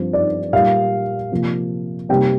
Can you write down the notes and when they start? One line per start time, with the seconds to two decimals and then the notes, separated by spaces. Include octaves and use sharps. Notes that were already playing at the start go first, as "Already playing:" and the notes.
Already playing: G2 F3 C4
0.13 D5
0.53 A#2 G3 A#3 F5
1.32 C3 F3 A#3
2.09 C3 G3 A#3 G5